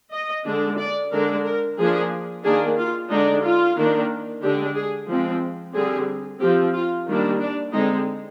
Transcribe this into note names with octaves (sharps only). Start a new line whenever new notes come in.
D#5
D3 G#3 D4
D5
D3 G#3 D4 A#4
A#4
F3 A#3 D4 G#4
D#3 A#3 D4 G#4
F4
D3 G#3 D4 D#4
F4
D#3 A#3 D4
D3 G#3 D4 G4
G#4
F3 G#3 C4
D3 G3 C4 G#4
F3 C4 G4
F4
D#3 G3 A#3 D4
D4
D3 G#3 C4 D#4